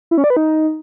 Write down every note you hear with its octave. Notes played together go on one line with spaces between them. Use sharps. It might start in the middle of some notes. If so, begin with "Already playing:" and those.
E4
C#4
D5
B4
D#4